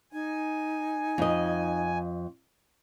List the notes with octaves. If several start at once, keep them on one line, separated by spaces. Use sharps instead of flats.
D#4 G#5
F2 D#5